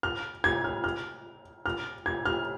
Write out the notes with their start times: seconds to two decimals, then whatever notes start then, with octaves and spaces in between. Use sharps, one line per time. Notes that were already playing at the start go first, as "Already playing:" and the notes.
0.03 F6
0.44 G#6
0.64 F6
0.84 F6
1.66 F6
2.06 G#6
2.26 F6